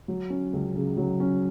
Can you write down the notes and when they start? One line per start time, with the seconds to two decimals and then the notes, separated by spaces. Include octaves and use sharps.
0.08 F#3
0.30 C#4
0.53 C#2
0.75 C#3
0.97 F#3
1.20 C#4